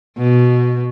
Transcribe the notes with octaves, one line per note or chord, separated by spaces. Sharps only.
B2